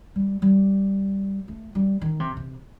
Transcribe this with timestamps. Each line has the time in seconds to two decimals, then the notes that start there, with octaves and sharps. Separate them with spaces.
0.16 G3
0.42 G3
1.48 A3
1.75 G3
2.01 D#3
2.20 C3
2.37 C3